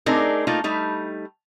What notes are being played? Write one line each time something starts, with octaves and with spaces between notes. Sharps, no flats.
A3 C4 D4 D#4 G#4 A#4
A3 A#3 D#4 F4
G3 A3 D#4